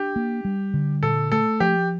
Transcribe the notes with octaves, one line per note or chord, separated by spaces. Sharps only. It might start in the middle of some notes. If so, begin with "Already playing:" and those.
Already playing: D4 G4
A#3
G3
D3
A#2 A4
A3 A4
F3 G4